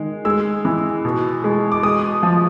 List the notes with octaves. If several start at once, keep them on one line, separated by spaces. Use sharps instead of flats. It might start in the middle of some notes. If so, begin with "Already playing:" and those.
Already playing: D#3 G#3
G#3 E6
E3
B2
G#3
D6
G#3 D#6
F3